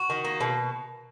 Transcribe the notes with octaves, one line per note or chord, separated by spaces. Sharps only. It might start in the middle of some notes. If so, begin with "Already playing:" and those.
Already playing: F#4
D#3
A#3
B2